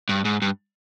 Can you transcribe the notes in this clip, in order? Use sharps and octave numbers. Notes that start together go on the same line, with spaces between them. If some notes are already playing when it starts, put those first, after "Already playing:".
G2
G#2
G2